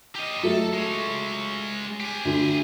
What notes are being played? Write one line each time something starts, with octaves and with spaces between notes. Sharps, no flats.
G4 D#5
F#3 A3 A4
G#3 C#5
G4 G#5
D2 D3